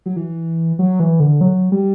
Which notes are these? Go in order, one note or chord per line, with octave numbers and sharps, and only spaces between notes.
F#3
E3
F#3
E3
D3
F#3
G3